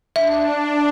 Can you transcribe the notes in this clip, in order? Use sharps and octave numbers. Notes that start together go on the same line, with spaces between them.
D4 E5